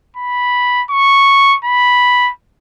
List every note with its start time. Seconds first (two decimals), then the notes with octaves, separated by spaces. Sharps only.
0.16 B5
0.90 C#6
1.65 B5